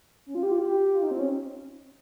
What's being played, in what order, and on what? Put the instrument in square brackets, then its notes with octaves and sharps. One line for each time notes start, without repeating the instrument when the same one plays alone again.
[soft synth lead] C#4
F4
G4
F4
G4
F4
D#4
C4
C#4